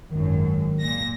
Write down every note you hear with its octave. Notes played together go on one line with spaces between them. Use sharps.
G#1 F#2 D#3
A#2 A#6